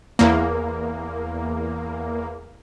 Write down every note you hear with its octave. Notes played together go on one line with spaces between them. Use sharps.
E2 A#3